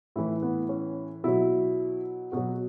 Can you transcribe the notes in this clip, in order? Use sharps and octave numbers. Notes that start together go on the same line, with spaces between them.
A2 E3 E4
B3
C#4
B2 F#3 E4
B2 F#3 F#4